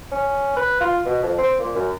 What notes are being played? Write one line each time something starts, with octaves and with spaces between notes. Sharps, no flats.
C#4
B4
F4
B2
F2
C4
A#2
F#2